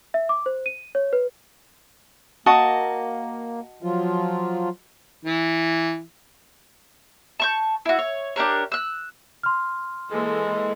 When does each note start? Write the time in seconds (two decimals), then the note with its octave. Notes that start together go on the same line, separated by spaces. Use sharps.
0.14 E5
0.29 D6
0.46 C5
0.66 D#7
0.95 C#5
1.13 B4
2.46 A#3 F#4 D#5 A5
3.83 F3 F#3 F4
5.25 E3
7.40 A5 C#6 G6
7.85 E4 F#4
7.99 C#5
8.36 D4 G4 A#4 C#5
8.72 E6 F#6
9.43 C6 F6
10.10 E3 G#3 A#3 A4